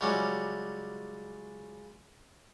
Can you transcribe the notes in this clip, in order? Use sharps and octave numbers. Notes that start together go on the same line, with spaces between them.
C#2 F#3 G3 C#4